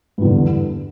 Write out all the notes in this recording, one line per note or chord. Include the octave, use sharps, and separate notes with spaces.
E2 G2 D3